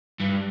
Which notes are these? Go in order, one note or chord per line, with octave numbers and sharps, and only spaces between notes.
G2